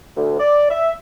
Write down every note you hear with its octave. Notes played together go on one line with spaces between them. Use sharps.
D2
D5
E5